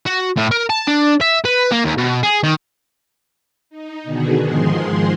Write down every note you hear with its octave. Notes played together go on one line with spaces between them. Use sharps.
F#4
A2
A#4
A5
D4
E5
B4
A#3
D#2
B2
G#4
D#3
D#4
B2 D3 D#3 B3 F#4 G#4
G#2 D#3 F3 G#3 G#4 C6